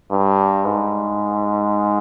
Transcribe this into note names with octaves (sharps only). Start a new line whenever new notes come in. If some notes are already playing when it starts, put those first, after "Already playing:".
G2
G#2